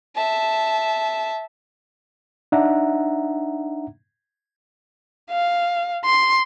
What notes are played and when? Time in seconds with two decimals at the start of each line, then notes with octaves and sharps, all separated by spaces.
0.15 E5 A5
2.52 D4 D#4 E5 F#5 A#5
5.31 F5
6.05 C6